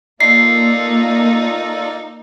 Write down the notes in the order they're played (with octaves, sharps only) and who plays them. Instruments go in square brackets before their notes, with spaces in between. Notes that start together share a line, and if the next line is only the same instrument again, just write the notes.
[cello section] A#3 [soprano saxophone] D#4 [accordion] F4 A4 D5 [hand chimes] C7